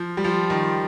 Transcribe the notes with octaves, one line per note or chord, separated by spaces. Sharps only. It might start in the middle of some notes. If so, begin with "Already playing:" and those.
Already playing: F3
G3
F3
D#3